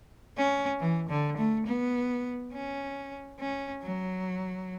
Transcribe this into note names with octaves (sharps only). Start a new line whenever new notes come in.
C#4
E3
D3
A3
B3
C#4
C#4
F#3